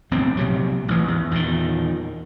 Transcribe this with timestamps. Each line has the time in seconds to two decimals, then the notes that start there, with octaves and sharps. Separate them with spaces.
0.11 D1 B1 G2 C4
0.37 A#1 C3 F#3
0.88 A1 G#2 E3
1.08 E2
1.31 E2 A#2 D3 D#3